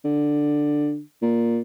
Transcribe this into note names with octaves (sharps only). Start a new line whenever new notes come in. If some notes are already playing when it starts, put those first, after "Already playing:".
D3
A#2